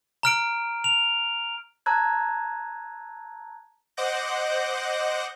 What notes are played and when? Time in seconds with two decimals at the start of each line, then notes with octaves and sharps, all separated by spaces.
0.23 A#5 F6 D7
0.84 F7
1.86 A5 A#5 E6 F#6 G#6
3.97 C5 D#5 F#5 D6 G6 A#6